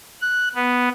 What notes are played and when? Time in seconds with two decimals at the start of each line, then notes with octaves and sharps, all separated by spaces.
0.21 F#6
0.55 B3